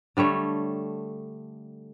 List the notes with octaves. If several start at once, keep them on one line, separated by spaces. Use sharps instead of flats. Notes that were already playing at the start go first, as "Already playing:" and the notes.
D3 G3 A3 C#5